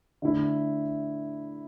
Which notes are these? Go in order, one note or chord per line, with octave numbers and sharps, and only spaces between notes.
D3 A3 E4